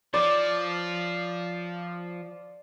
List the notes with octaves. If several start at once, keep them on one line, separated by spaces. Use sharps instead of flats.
F3 D5